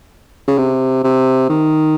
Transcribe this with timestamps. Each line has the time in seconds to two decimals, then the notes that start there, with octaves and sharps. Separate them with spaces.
0.48 C#3
0.58 C3
1.04 C3
1.49 D#3